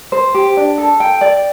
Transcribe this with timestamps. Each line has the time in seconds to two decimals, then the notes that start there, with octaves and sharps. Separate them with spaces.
0.12 C5
0.34 G4
0.57 D4
0.78 A4
1.00 G5
1.21 D5